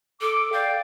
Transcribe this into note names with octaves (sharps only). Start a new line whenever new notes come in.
A4 D6
D5 F5 G5